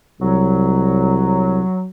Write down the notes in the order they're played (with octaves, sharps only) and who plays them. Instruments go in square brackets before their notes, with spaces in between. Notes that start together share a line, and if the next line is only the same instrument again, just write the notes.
[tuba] C2 [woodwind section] F#3